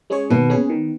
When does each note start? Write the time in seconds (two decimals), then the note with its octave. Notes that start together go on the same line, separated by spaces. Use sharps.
0.10 G#3 C#4 G#4 C#5
0.30 B2 D#3
0.49 G#3 C#4 G#4
0.70 D#3